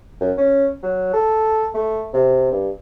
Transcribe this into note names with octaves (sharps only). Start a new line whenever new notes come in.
F#2
C#4
F#3
A4
A3
C3
G2